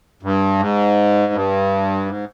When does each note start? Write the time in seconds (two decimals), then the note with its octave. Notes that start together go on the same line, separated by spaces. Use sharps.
0.23 G2
0.59 G#2
1.33 G2
2.06 G#2